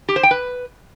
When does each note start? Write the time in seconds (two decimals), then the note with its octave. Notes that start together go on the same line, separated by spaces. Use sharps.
0.08 G4
0.16 C5
0.23 G5
0.31 B4